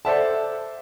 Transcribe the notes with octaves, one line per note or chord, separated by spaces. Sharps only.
A4 C5 D5 E5 F#5 A5